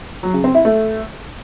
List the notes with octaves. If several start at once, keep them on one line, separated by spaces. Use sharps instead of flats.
F#3
C#3
C4
E4
A3